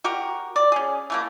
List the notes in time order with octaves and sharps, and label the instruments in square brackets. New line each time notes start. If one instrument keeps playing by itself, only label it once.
[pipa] F#4 G4 A#4
D5
C#4 G#4
E3 A3 A#3